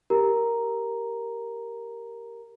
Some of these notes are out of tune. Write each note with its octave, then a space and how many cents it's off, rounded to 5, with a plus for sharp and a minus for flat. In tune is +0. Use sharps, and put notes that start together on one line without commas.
G4 +0 A#4 +0 A#5 +0